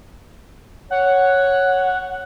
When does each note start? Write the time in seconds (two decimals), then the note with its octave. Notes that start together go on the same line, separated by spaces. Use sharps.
0.91 C#5 F#5